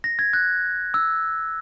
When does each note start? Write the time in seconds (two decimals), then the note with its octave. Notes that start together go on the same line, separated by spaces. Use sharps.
0.04 A#6
0.19 G#6
0.33 F#6
0.94 E6